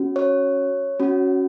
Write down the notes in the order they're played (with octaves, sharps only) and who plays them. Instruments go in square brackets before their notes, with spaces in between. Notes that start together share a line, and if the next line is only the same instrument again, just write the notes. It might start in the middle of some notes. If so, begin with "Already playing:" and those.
Already playing: [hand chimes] C#4 F#4
C#5
C#4 F#4